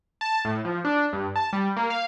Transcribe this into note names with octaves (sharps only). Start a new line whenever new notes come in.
A5
A2
F3
D4
G2
A5
G3
A#3
F5